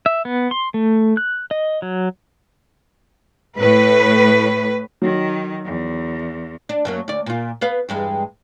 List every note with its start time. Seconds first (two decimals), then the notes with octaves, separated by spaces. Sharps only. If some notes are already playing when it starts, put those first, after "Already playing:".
0.06 E5
0.25 B3
0.51 C6
0.74 A3
1.17 F#6
1.51 D#5
1.82 F#3
3.57 A2 B4
5.02 D#3 F#3
5.65 E2
6.69 D4
6.85 F#2 F#3 A#3
7.08 D2 D5
7.26 A#2 F4
7.61 B3 B4 F5
7.89 E2 G2 G#3